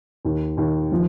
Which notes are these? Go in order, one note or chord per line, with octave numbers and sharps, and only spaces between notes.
D#2
D#2
F3